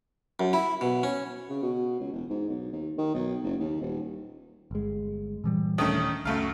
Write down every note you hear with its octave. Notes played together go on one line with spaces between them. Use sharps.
F#2
E4
B2
C#4
C#3
B2
C#2
E1
G#2
B1
D#2
D#3
B1
F#1
D#2
D#1
G1 G#3
A#2 E3 G3
D#1 D#3 A3 C#4 D4
C#2 F#2 A3 F5